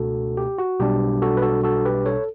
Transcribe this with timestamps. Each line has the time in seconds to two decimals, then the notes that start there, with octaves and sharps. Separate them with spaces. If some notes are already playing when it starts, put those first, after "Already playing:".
Already playing: C#2 B2 A3 D4 F#4 A4
0.37 G4
0.58 F#4
0.80 B1 B2 G3 D4 G4
1.22 F#4 A4
1.37 B4
1.42 F#4 A4
1.63 F#4 A4
1.85 G4 B4
2.05 A4 C#5